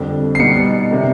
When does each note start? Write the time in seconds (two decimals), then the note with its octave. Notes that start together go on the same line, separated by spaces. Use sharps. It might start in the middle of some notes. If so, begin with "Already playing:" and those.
Already playing: F2 D3 G3
0.35 C7
0.39 B2 G3 B3 D#4 C#7
0.91 C3 D#3 G3